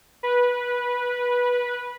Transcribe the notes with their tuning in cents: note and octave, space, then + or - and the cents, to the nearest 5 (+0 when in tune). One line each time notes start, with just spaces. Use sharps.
B4 -15